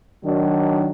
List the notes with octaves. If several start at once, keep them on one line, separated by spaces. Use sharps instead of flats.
D#3 F#3 D4